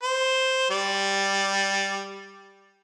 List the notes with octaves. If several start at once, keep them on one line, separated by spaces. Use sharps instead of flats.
C5
G3 D5